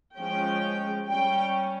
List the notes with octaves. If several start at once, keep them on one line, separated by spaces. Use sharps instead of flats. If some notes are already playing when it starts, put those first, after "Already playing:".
F3 G#3 C#4 G5
G3 C#4 G5